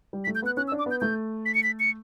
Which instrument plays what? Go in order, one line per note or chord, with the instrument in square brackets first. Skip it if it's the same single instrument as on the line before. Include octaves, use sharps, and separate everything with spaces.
[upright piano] G3
[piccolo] B6
[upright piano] A3
[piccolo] G6
[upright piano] B3 [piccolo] F#6
[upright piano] C#4 [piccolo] F#6
[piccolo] E6
[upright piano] D4
[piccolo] D6
[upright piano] B3 [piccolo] G6
[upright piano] A3 [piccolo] G6
[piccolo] B6
C#7
B6
C#7